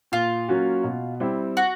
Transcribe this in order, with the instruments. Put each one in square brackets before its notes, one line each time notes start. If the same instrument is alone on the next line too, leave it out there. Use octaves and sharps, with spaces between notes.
[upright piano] A#2 [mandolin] F4
[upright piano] F#3 A#3 C#4 F#4
B2
G3 C4 E4
[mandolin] F#4